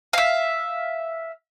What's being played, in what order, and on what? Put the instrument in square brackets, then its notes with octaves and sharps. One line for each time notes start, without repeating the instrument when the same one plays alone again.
[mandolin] E5 F5